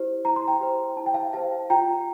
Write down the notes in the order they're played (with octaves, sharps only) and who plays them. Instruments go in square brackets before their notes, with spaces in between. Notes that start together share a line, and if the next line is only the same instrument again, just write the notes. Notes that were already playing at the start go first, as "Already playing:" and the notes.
Already playing: [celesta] E4 G4 C5
E4 A#5
C6
G5 A#5
G4 C5
E4 A5
G5
F5 A5
G4 C5 F5 A5
F4 G5 A#5